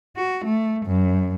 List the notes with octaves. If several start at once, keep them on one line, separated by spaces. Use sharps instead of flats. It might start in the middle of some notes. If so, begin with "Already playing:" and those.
F#4
A3
F#2